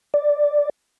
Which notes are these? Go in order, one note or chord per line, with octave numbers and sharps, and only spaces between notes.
D5